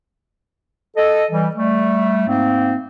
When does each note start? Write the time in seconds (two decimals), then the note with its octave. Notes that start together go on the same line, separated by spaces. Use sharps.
0.96 A4 D#5
1.30 E3 G3
1.55 G3 A3
2.27 G#2 A#3 C4